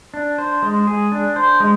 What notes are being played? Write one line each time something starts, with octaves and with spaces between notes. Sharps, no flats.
D4
C5
G#3
G#4
D4
C5
G#3